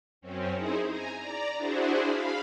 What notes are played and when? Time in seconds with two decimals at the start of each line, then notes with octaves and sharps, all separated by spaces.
0.21 F#2 C4 C#4
0.56 D#4 E4 G#4 C5
0.87 G#5 A#5
1.17 D5 A#5
1.57 D4 E4 F#4 G#4 C5
2.02 F5 B5